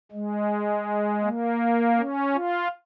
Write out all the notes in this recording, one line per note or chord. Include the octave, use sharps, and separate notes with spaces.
G#3
A#3
C#4
F4